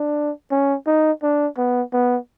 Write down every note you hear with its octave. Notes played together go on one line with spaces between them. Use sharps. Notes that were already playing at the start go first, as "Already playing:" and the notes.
Already playing: D4
C#4
D#4
D4
B3
B3